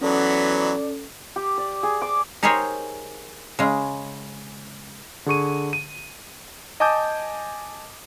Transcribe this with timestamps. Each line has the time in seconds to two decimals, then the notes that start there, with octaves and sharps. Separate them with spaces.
0.01 E3 F#3 B3 C#4 A4 D5
1.36 G4
1.58 D5
1.83 G#4
2.02 D6
2.43 D#4 G4 G#4 A#4 C5 C#5
3.59 C#3 G#3
5.26 D3 G#4 C#6 D#7
5.73 D#7
6.80 D#5 G#5 A5 D6 D#6 G6